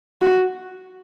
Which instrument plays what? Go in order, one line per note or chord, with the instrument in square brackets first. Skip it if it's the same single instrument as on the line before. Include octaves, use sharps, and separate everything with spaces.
[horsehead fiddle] F#4